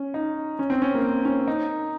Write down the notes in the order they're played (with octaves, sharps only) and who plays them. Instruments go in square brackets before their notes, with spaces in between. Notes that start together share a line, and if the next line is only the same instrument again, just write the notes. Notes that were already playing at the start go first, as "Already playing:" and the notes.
Already playing: [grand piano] C#4
D#4
C#4
C4
C#4
A#3
C4
C#4
D#4